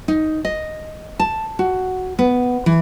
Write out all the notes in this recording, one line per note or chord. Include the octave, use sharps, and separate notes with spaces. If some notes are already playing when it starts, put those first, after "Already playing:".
D#4
D#5
A5
F#4
B3
E3